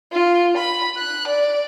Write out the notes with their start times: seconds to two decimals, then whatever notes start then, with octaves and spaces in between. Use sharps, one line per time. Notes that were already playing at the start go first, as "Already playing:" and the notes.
0.12 F4
0.57 B5
0.97 F#6
1.27 D5